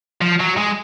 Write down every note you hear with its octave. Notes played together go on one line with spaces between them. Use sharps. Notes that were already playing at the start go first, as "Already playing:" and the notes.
F3
F#3
G#3